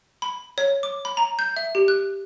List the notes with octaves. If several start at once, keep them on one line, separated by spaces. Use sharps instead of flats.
B5
C#5
D6
B5
A#5
G6
E5
G4
F#6